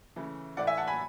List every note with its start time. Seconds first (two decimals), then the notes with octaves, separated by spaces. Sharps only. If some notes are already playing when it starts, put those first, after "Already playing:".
0.16 C#3 E3 A3
0.57 A2 E3 A3 D5 F#5
0.67 E5 G#5
0.77 F#5 A5
0.87 G#5 B5